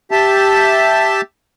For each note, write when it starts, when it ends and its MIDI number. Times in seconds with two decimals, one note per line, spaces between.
0.11 1.21 67
0.11 1.21 76
0.11 1.21 81